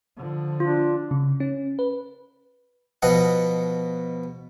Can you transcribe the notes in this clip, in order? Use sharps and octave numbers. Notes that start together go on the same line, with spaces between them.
D3 F3
D4 F4
C#3
C#4
B4
B2 F3 B3 D#5 F#5